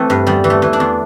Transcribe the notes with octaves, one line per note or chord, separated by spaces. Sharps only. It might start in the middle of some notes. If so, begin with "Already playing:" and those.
Already playing: E3 A3 C4
G2
E2 G3
E3
A3
E3
D4
E2